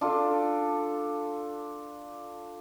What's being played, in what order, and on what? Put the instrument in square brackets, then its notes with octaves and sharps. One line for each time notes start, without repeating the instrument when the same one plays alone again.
[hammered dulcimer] D4 F4 A4